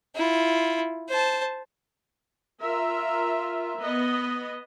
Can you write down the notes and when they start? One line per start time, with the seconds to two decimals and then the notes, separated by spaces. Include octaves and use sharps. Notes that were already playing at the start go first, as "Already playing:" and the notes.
0.15 E4 F4
1.09 C5 A5
2.60 F4 A#4 E5
3.79 B3 D#5